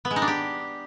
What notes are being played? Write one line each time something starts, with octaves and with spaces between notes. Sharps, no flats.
B3
G#3
D#4
D4
G4